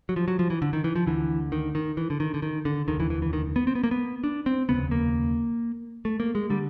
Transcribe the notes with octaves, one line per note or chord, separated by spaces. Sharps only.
F#3
F3
F#3
F3
E3
D3
D#3
E3
F3
D2 D3 E3
D#3
D#3
E3
D3
D#3
D3
D#3
D3
F1 D#2 D3 D#3
E3
E3
E3
D#3
B3
C4
B3
A#3
B3
D4
C4
F1 D#2 C#3 B3
A#3
A3
A#3
G#3
D3 G3